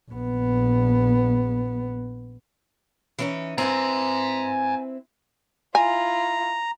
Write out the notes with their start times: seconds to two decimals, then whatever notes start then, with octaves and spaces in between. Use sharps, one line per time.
0.11 A#1 B3
3.18 E3 C#4 D#4
3.58 C4 E4 B4 G#5 A#5
5.75 E4 F4 G#5 A#5